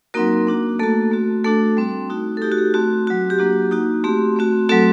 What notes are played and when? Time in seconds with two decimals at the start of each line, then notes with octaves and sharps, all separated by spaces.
0.14 F#3 A#3 C4 D#4 F#4 A#4
0.47 A#3 D4 F#4
0.79 A3 A#3 F#4 A4
1.11 A3 C4 F#4
1.44 A3 D4 F#4 A4
1.77 G3 C4 F#4
2.10 A3 D#4 F#4
2.37 A4
2.41 A3 D#4 F#4 G4
2.52 F#4
2.58 G4
2.74 A3 C4 F#4
3.07 F#3 C4 F#4
3.30 G4
3.39 F#3 A#3 D4 F#4
3.71 A#3 D#4 F#4
4.04 A3 C4 F#4 G4
4.36 A3 C4 F#4
4.69 F#3 A3 C4 F#4 A4